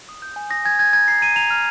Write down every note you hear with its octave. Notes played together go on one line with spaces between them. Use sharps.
D#6
G6
G#5
D#6 A#6
G#5 G#6
G#5 G#6
A#5 G#6
A#5 C7
A#5 D#7
A#5 F7
F6